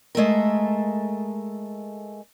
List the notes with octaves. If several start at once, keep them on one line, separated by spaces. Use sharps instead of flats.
G#3 A3 A4 A#4